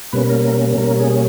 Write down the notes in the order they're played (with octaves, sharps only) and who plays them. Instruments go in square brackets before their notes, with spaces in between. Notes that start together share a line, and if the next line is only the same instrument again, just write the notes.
[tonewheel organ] B2 G3 A#3 C#4 B4
A#4
A#4
B2 G3 A#3 C#4 A#4
G#4